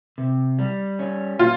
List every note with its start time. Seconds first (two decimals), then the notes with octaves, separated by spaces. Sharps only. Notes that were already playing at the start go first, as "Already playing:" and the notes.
0.18 C3
0.59 G3
0.99 C#4
1.39 A#2 F4